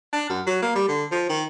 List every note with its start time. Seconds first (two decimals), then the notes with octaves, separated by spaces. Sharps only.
0.13 D4
0.30 F#2
0.47 F#3
0.62 A#3
0.76 G3
0.89 D3
1.12 F3
1.30 D#3